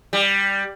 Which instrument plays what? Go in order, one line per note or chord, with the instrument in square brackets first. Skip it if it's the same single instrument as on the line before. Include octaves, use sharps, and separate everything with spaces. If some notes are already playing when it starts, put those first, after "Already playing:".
[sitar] G3